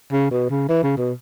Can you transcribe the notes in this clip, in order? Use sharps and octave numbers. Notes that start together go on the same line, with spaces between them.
C#3
B2
C#3
E3
C#3
B2